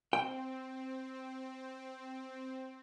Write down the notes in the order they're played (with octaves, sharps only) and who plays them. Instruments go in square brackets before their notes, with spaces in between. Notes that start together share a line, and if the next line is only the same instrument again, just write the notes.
[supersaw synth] C4 [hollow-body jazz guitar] G5